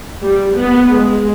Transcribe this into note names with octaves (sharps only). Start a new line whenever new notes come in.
G3
B3
G#3